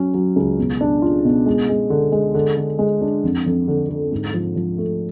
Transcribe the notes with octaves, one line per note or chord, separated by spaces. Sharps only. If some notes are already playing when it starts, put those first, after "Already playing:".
Already playing: F#3 C#4
F#3
C#2
B2
D4
F4
B2
G#3
G#3
D3
G#3
D3
D3
G#3
D4
F2
F2
D3
D3
G#2
F3
F3
A3